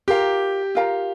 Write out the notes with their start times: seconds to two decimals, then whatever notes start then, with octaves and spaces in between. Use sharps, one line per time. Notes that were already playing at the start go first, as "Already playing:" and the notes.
0.08 F4 G4 A#4 F5 A#5
0.75 F4 A#4 F5 A#5